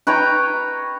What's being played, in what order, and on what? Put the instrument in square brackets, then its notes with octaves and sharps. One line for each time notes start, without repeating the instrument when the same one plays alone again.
[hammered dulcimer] B4 C#5 G5 A#5